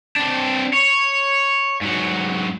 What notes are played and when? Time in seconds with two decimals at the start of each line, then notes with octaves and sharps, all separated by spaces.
0.16 C4 D4
0.74 C#5
1.82 G#2 F#3